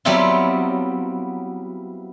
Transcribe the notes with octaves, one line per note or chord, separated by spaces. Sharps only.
F#3 G3 B3 C4 E4 F4